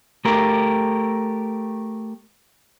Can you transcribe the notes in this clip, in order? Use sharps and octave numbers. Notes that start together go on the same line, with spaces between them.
A3 G4 A#4